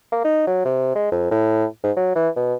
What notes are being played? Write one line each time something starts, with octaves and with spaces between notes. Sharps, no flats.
A#3
D#4
F#3
C3
G#3
F2
A2
G#2
F#3
E3
B2